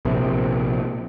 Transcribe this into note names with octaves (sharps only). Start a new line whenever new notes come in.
A#1 C3